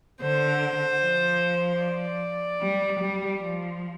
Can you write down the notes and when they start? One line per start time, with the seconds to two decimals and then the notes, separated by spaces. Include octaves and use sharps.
0.21 D3 C5
1.01 F3
1.80 D5
2.61 G3
3.00 G3
3.40 F3